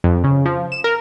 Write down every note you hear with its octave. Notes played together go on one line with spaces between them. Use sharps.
F2
C#3
F3
E7
A#4